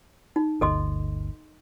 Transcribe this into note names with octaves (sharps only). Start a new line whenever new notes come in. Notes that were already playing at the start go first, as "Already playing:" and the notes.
D#4
G1 D2 A4 D#5 C6